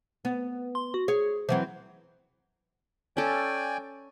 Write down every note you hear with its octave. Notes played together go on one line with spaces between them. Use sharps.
B3
C6
F#4
G#4 C#5
E3 F#3 C4 C5
C#4 A4 D5 G5 G#5